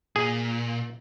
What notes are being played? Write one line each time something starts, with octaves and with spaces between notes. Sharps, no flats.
A#2 G#4